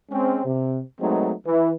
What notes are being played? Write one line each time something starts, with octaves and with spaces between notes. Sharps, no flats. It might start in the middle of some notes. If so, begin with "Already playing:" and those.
G#3 C4 C#4
C3
F#3 G#3 A3 B3 C4 D#4
E3